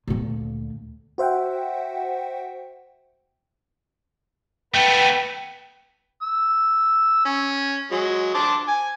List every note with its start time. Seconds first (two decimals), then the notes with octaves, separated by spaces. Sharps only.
0.08 D2 A#2
1.18 F#4 C5 E5 F#5 G5
4.74 A3 B3 B4 G5
6.22 E6
7.25 C#4
7.91 F#3 G#3
8.34 C5 A5 D6
8.68 G#5